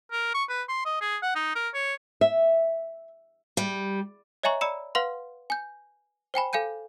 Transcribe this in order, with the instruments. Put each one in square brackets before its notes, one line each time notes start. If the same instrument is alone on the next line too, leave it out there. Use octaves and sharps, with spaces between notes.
[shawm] A#4
C#6
B4
C6
D#5
G#4
F#5
D#4
A#4
C#5
[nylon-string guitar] E5
[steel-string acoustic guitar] G3
[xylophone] C#5 D#5 E5 G#5 A#5 C#6
D5 A#5 B5 E6 C#7 E7
B4 F5 F#5 C6
G#5 G6
C5 G5 G#5 B5
A4 F5 G#5 G6 D#7